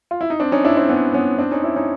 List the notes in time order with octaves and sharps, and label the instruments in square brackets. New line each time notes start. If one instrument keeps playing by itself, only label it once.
[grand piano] F4
E4
D#4
C4 D4
C#4 D#4
D4 E4
C4 D4
B3 C#4
B3 C#4
C4 D4
C#4 D#4
D4 E4
C#4 D#4